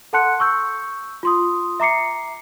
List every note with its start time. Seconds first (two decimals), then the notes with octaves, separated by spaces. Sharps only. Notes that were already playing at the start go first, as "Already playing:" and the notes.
0.13 A4 F#5 A5 C6 F#6 C#7
0.40 C#6 E6 G6
1.23 F4 C6 D#6
1.80 E5 A#5 D6 C7 C#7